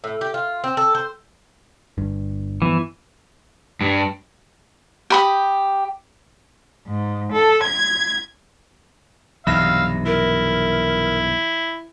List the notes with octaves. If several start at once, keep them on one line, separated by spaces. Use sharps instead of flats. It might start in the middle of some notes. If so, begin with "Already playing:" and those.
A2
G4
F4
C4
A4
C5
G1 G2
G2 E3 F3 B3
G2
G4 B5 D#6
G#2
A4
G#6
B1 G2 C3 E3 E5 F5 E6 A#6
E4 A#4